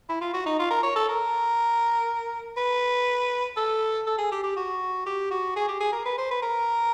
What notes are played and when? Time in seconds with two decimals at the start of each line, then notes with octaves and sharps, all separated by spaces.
0.09 E4
0.21 F4
0.33 F#4
0.46 D#4
0.59 F4
0.71 A#4
0.83 C#5
0.96 A4
1.08 A#4
2.57 B4
3.57 A4
4.07 A4
4.18 G#4
4.32 G4
4.43 G4
4.57 F#4
5.06 G4
5.31 F#4
5.56 G#4
5.68 G4
5.81 G#4
5.93 A#4
6.05 B4
6.18 C5
6.31 B4
6.42 A#4